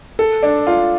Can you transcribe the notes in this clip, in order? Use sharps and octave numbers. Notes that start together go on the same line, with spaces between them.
A4
D4
F4